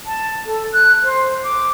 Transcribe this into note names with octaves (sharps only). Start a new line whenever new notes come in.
A5
A4
F#6
C5
D6